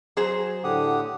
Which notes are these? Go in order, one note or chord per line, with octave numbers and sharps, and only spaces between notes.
F#3 G#4 C5
A2 D3 G4 F#5 D#6